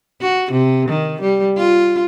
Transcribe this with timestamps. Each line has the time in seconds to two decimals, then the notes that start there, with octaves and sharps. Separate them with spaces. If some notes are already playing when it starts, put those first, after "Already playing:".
0.22 F#4
0.52 C3
0.89 D#3
1.21 G3
1.57 F4